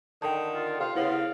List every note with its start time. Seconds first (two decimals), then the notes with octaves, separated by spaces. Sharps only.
0.22 D3 D#3 G5 A5
0.55 F4
0.80 C3 F4 F5
0.95 C#3 B3 E4 F5